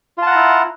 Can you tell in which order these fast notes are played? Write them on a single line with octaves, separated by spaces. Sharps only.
F4 A5 F#5 A#5 E4